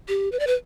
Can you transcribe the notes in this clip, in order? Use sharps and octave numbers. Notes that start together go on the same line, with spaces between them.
G4
B4
D5
B4